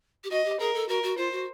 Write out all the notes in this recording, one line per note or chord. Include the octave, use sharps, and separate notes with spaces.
G4
F#4 D#5
G4
G#4 A#4
A4
F#4 A#4
F#4
F4 C5
F#4